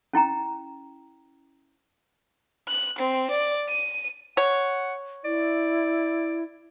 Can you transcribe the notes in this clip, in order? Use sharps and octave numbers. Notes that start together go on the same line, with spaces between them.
C#4 E4 G5 A#5
F#6
C4
D5
D#7
C#5 F#5
E4 D5